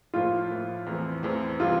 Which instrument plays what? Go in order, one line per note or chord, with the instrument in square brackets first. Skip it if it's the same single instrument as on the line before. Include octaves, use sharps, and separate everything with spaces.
[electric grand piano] A2 F3 A#3 E4 [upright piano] F4
[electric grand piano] A2 F3 A#3 E4
E2 E3 A3 C4 E4
E2 E3 A3 C4 E4
[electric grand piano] C3 E3 G3 [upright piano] F4